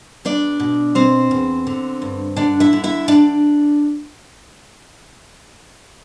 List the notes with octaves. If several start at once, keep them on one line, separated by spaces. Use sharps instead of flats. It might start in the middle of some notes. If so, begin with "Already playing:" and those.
E2 D4 D5
B2
B2 C4 C5
E2
D3
G2
D3 D4 D5
E4 E5
D3
E4 E5
D4 D5